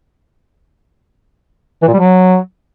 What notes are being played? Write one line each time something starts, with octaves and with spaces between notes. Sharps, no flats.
E3
A#2
G3
F#3